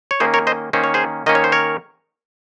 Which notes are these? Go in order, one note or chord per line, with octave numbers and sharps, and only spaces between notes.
C#5
D#3 A#3 C#4 G#4 C5
A#4 C#5
C5 D#5
D#3 A#3 C#4 C5
C#5
G#4 C5
D#3 A#3 C#4 D#5
C#5
C5
A#4 C#5